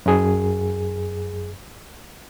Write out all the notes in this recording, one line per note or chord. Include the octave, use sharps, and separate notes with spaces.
F#2 G#4